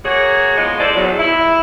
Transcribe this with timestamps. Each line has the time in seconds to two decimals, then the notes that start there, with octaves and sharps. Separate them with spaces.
0.04 A#3 F#4 G#4 C#5
0.56 E2 F3 G#3
0.79 A4 C5 D5
0.95 E2 F#3
1.18 E4